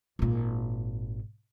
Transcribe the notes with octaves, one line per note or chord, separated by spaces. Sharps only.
G#1 A#2